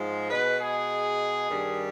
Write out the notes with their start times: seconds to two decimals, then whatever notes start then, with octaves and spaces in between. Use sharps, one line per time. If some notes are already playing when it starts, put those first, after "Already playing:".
Already playing: G#2 F3 G#3
0.29 B2 G#3 B4
0.59 G#4
1.49 G2 D#3 G3